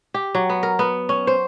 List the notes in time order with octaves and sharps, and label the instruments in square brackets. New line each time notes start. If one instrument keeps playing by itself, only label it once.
[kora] G4
F#3
B3
A#4
B3
C#4
C5